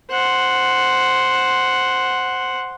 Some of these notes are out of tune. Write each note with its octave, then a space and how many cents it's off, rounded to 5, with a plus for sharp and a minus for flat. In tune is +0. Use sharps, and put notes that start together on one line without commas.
C5 +0 F#5 +0